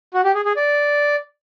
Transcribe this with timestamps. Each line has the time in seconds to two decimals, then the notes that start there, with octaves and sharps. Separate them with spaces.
0.14 F#4
0.24 G4
0.35 G#4
0.45 G#4
0.56 D5